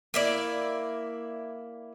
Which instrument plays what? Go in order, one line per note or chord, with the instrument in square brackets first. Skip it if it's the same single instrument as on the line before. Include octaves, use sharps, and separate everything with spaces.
[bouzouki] A#3 E4 D5